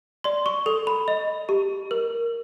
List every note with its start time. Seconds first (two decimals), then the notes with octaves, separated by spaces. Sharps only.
0.24 D5 C6
0.46 C#6
0.66 A4
0.87 B5
1.08 D#5
1.49 G4
1.91 A#4